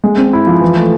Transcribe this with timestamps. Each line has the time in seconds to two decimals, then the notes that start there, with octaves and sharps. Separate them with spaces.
0.04 G#3
0.17 C4
0.33 E4
0.47 F3
0.61 E3
0.77 A3